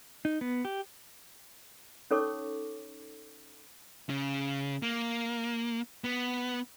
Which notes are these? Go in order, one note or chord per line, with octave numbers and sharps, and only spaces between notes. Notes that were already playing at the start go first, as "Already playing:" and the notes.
D#4
B3
G4
C#4 D#4 A4 C#5 C#6 D6
C#3
A#3
B3